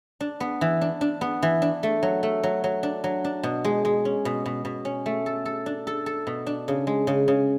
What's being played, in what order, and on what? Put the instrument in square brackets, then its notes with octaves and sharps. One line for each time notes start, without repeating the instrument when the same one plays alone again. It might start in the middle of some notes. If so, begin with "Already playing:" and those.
[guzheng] D4
B3
E3
D4
D4
B3
E3
D4
A3
F#3
A3
F#3
F#3
D4
F#3
D4
B2
G#3
G#3
C#4
B2
B2
B2
C#4
A3
A4
A4
D4
A4
A4
B2
D4
C#3
G#3
C#3
C#3